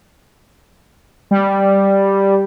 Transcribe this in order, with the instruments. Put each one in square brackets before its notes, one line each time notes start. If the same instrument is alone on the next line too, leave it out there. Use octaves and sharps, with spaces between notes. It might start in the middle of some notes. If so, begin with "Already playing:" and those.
[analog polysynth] G3